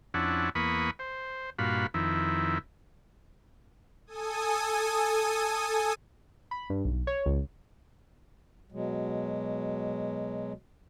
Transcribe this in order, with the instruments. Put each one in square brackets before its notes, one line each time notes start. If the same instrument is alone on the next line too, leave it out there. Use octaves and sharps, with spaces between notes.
[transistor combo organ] F2 C#4 D4 E4 F#5
E2 A#3 B4 B5 C#6 D#6
C5
G2 A#2 F#4 F5 B5
F2 D#3 E4
[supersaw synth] A4 G#5 D#6
[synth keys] B5
G2
B1
C#5
C#2
[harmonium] B2 F#3 G#3